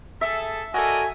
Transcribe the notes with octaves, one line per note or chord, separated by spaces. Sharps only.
G#4 A4 E5
F#4 A4 A#4 D5 D#5 G#5